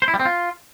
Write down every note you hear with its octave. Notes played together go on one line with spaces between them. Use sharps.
C5
E4
G3
C4
F4